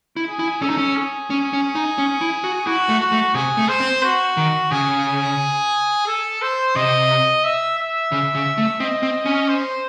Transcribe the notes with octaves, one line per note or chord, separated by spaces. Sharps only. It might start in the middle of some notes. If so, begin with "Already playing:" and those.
E4
G#4
E4
C#4 A4
D#4
C#4
G#4
C#4
C#4
D#4
C#4
E4
F#4
E4 F#4
A3
F#4
A3
C3 G#4
A3
C5
C4
F#4
D#3
C#3 G#4
A4
C5
C3 D#5
E5
E5
C#3
C#3
A3
C4 D#5
C4
C#4
C5